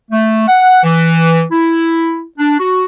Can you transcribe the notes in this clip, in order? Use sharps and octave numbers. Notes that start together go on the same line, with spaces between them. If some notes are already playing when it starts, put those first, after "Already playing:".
A3
F#5
E3
E4
D4
F#4